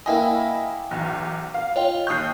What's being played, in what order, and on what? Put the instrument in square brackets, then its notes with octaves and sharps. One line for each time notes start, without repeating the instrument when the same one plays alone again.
[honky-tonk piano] A#3 E4 D#5 [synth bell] F5 G5 G#5
[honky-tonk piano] B1 E2
F5
[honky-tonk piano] F4 [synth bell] C#5 D#5 G5
[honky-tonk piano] D#2 G6 [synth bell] C#6 D#6 C7